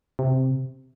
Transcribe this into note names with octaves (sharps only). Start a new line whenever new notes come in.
C3